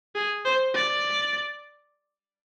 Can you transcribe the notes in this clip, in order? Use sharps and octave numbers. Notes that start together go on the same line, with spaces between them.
G#4
C5
D5